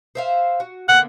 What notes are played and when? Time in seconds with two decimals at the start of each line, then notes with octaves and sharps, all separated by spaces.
0.15 C5 E5 F5
0.60 F#4
0.88 D3 A#3 B3 F#5